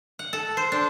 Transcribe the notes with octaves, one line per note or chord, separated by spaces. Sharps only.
F#5
A4
C5
D4